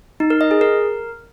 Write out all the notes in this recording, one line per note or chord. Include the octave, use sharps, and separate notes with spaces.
D#4
A#4
D#5
G#4
A#4